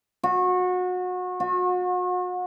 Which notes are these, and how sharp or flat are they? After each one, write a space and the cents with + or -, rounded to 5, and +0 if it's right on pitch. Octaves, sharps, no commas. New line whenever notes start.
F#4 -30
F#4 -40